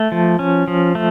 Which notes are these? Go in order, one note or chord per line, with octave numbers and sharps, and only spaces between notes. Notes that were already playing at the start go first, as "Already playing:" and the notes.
Already playing: A3
F3
C#4
F3
A3